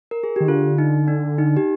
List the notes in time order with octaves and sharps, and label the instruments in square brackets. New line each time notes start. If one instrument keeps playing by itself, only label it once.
[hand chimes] A#4
G#4
[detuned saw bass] D#3 [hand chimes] G4
[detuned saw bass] D3 [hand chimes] F4
[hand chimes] D#4
D4
D#4
G4